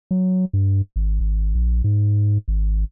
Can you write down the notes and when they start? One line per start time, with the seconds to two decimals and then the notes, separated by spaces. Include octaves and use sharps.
0.11 F#3
0.53 G2
0.96 G#1
1.20 G#1
1.55 A#1
1.84 G#2
2.48 G#1